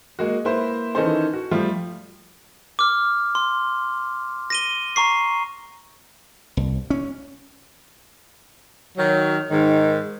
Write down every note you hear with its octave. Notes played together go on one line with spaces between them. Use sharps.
G#3 A#3 F#4
A#3 E4 B4 C5
D#3 E3 C#4 D#4 A4 C5
F#4
F3 G3 A3 F4
D6 F6
C6
A#6 D#7 G7
A#5 C#6 C7
C2
C#4
D#3 F#3
G#2 D#3